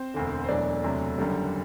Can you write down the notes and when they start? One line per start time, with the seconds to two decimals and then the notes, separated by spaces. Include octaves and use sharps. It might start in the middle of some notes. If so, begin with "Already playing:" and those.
Already playing: C4 C5
0.14 E1 D2 D3
0.44 C5
0.48 E1 E2 B2 F#3 A3 D4 D5
0.84 E1 D2 C3 F#3 A3
1.18 F#1 F#2 D3 G3